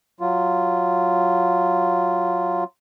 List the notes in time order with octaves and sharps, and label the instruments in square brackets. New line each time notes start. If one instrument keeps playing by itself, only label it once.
[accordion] F#3 F4